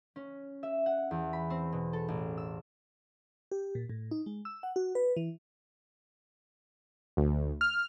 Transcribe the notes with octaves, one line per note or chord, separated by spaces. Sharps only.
C#4
E5
F#5
E2
B5
C4
B2
A4
A1
E6
G4
A#2
A2
D#4
G#3
E6
F#5
F#4
B4
E3
D2
F6